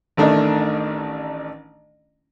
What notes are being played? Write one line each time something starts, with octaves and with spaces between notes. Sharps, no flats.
A1 D#3 A3 D4 D#4